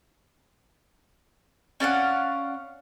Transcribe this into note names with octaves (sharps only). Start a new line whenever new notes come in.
C#4 D5 F5 F#5